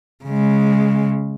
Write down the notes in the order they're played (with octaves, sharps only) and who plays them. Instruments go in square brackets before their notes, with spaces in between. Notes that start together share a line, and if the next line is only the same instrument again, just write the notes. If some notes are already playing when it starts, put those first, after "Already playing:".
[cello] C#3 G#3